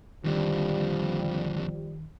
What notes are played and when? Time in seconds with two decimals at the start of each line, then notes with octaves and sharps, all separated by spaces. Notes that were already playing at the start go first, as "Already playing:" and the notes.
0.24 F2 D3 D#3 F3 G3